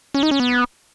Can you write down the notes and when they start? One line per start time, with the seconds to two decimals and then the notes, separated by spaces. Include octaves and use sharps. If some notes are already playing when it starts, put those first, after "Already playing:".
0.14 C#4
0.23 D#4
0.31 C#4
0.40 B3